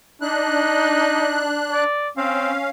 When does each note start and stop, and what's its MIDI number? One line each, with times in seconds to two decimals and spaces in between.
0.22 1.84 62
0.22 1.55 63
0.22 1.84 90
1.71 2.08 74
2.17 2.53 60
2.17 2.70 61
2.17 2.70 77